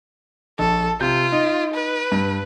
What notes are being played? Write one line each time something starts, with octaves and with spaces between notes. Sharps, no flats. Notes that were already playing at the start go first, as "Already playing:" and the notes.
A#1 A4
C3 F4 G6
D#4
B4
G2